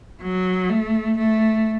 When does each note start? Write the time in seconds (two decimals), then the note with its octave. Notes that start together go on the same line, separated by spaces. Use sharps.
0.22 F#3
0.69 A3
1.18 A3